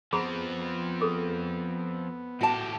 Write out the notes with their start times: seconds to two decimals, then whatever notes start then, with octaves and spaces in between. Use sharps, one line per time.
0.13 F3 B3 C4 G#4 A#5 B5
1.01 G#4 A4
2.41 A2 F#4 G4 A5